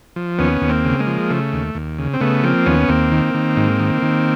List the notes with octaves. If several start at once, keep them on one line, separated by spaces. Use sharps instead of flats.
F3
D#2 B3 C#4
D#2
A#3 C4
C#3
G#3 A#3
F3
C#3 A3
D#2
D#2
C#3
C4
C#3 A3 B3
F3 A#3 C4
D#2 B3 C#4
D#2 A#3 C4
D#3
D#3
G#2
D#3
D#3